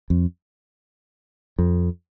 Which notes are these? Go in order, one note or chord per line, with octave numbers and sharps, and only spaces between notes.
F2
F2